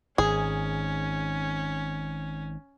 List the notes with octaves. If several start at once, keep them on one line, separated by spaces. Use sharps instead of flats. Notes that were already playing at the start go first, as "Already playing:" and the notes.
G#1 C#4 G#4